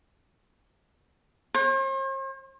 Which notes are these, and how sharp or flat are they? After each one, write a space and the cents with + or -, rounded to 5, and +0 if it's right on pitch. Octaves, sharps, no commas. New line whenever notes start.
C5 +45